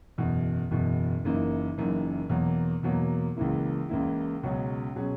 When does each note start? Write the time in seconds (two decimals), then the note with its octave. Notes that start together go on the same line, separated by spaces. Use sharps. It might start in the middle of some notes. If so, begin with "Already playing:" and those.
0.18 F#1 E2 B2
0.70 F#1 E2 B2
1.24 F#1 F#2 E3 A#3 D#4
1.77 F#1 F#2 E3 A#3 D#4
2.30 E2 B2 F#3 A#3
2.83 E2 B2 F#3 A#3
3.36 C#2 C#3 E3 A#3 E4
3.89 C#2 C#3 E3 A#3 E4
4.43 C#2 B2 F#3 C#4 G#4
4.96 B2 F#3 C#4 G#4